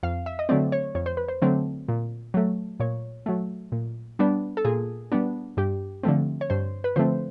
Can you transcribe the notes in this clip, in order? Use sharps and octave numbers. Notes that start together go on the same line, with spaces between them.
F2 F5
E5
D#5
D3 F#3 A3 C4 D5
C#5
F2 C#5
C5
B4
C5
D3 F#3 A3 C4
A#2
F#3 A3
A#2 C#5
F#3 A3
A#2
G3 B3 D4
A4
A#2 G#4
G3 B3 D4
G2 G4
D3 F3 A3 C4
C#5
G2 C5
B4
D3 F3 A3 C4 C5